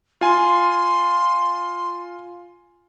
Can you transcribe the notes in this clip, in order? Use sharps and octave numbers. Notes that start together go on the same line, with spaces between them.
F4 G#5 C6